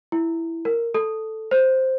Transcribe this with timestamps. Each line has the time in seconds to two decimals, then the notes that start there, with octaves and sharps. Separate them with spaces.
0.12 E4
0.65 A#4
0.94 A4
1.51 C5